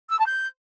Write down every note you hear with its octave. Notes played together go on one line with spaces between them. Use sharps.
E6
A5
G6